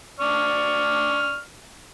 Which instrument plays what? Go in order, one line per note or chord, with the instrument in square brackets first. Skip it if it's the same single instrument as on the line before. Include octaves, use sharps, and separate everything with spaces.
[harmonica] D5 C#6 F6